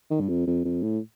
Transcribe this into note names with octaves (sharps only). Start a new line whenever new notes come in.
D#3
G2
F2
F2
F2
A2